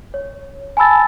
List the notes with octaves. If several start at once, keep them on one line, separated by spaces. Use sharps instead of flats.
C#5
G#5 A5 B5 E6 A6